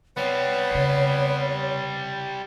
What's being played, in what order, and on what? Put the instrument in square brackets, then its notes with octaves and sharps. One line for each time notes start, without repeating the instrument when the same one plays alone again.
[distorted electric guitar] G3 C4 [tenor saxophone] B3 [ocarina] C#5
[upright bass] E2 C#3